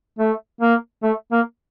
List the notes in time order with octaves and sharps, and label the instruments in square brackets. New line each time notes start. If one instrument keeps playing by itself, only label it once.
[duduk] A3
A#3
A3
A#3